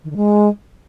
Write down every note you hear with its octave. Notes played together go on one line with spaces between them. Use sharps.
D#3
D3
G#3